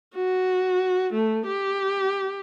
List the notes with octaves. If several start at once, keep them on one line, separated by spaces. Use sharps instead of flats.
F#4
A3
G4